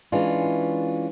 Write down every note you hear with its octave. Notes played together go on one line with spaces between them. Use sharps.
E3 G#3 C#4 D4 F4